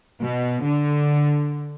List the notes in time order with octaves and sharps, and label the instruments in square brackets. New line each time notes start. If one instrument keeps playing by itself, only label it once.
[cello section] B2
D3